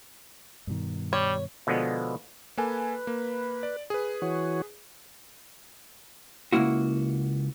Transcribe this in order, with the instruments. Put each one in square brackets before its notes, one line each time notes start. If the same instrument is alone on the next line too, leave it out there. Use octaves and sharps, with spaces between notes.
[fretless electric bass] G2 B2 D#3
[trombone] G3 [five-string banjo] C#5
[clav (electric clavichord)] B2 D3 F3 G#3 B3
[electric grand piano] A#3 A4 G#5 [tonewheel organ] B4
[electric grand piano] A#3
D5
G#4 B4
[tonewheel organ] E3 F#4 C#5
[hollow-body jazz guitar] C#2 G#2 A#3 E4 F#4